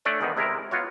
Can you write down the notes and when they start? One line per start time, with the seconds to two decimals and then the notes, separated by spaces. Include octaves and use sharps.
0.05 A3 D4 C#5 D5 G#5
0.21 E2 G#2 D#3 B3 D#4
0.37 C3 G#3 E4 A#4
0.71 B3 F4 F#4 C#5